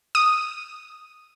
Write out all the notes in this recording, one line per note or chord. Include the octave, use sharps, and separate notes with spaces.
D#6